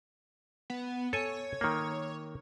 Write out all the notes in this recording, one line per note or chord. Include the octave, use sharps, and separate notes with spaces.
B3
A4 C#5 G#5
D#3 A#3